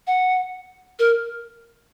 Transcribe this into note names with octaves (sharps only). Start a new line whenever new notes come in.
F#5
A#4